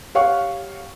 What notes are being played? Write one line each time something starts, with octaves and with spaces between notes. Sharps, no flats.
G4 C#5 F5 F#5 C#6